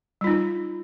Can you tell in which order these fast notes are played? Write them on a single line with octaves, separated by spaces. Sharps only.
G3 F4 D#4